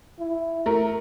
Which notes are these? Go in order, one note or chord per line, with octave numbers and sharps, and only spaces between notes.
E4
A3 A#4